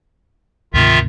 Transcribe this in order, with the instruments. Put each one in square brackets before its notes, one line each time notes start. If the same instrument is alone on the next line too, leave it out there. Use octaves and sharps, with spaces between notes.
[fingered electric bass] D2 G#2 C3 [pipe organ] D#3 F4 E5